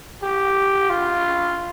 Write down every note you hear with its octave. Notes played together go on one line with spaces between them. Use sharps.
G4
F4